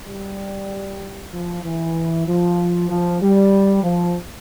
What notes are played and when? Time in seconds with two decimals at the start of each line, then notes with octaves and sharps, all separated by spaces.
0.08 G3
1.33 F3
1.64 E3
2.27 F3
2.90 F3
3.22 G3
3.83 F3